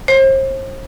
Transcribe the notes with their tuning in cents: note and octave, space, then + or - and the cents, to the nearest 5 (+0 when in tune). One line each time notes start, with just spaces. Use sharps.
C5 +40